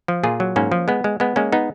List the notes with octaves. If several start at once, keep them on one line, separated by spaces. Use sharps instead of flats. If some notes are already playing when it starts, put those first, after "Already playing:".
F3
A#2 F4 G#4
F#3
G#2 A#3 C#4
F3
G#3 B3
G#3
G#3 B3
G#3 A#3 C#4
B3 D#4